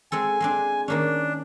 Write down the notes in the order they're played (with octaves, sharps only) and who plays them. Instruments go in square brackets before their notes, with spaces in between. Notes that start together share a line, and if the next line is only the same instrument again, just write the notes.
[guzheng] G#3 C4 A4 [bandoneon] G#5
[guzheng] G#3 C4 D4
[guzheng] D#3 A#3 C#4 [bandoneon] D4